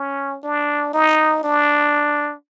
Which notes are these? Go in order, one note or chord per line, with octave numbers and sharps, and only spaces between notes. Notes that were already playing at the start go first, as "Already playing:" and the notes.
Already playing: C#4
D4
D#4
D4